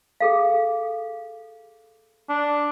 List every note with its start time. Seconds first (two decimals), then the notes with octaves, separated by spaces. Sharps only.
0.20 G#4 A4 F5
2.29 D4